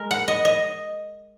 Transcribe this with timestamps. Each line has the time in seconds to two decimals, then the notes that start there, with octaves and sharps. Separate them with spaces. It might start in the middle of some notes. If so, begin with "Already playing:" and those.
Already playing: G#3 A#4
0.11 F#5
0.28 D#5
0.45 D#5